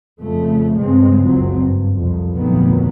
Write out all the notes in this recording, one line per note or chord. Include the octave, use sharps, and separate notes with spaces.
F2 C#3 A3
C2 G2 C#3 G#3 C4
F#1 C#2 F#3 C4
G2
C2 F2
F1 D2 A#2 D#3 F#3 B3